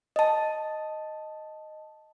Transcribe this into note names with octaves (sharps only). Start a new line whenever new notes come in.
D#5 A5